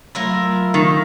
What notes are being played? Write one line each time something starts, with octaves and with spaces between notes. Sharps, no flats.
F#3 A3 E4 F4 A#4 E6
D#3